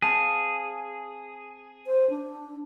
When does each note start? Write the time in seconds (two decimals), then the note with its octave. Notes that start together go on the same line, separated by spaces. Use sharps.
0.02 C4 G#4 F5 A5
1.87 C5
2.10 D4